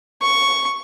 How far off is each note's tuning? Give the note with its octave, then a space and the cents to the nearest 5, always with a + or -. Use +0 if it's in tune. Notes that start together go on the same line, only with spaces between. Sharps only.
C#6 +5